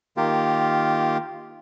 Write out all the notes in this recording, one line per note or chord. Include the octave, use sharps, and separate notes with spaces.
D#3 A#3 F4 G4